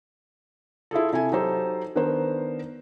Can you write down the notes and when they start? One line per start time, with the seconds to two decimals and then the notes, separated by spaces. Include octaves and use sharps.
0.91 E4 F4 G#4 A4
1.12 C3 E4 A4 G#5
1.32 F#3 D#4 G4 A4 C5
1.95 D#3 B3 D4 A#4 C5